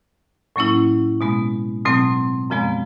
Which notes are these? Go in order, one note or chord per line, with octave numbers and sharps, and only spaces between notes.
A2 F#3 A#3 C#4 E4
B2 G#3 B3
B2 F#3 A3 C4
F#2 C#3 F3 G#3 B3